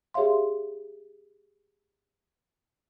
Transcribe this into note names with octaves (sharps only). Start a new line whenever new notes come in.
G4 G#4 C#5 E5 F5 C6